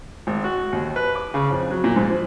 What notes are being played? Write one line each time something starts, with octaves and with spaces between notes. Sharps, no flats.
G#1
F#4
D#2
B4
D6
C#3
F2
F#3
A#2
G#2
F3